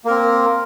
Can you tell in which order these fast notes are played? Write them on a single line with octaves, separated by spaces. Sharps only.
A#3 A#4 C4